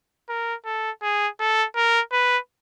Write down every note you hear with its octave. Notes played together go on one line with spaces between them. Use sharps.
A#4
A4
G#4
A4
A#4
B4